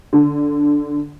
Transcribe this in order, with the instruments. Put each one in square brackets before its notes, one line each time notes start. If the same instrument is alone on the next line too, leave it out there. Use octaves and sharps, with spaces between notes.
[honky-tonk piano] D3